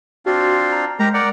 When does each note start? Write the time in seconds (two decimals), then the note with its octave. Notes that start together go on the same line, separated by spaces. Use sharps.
0.26 C4 D4 F4 F#4
0.72 A#5
0.99 G#3 G4 A#4 A#5
1.14 A#4 D5 F#5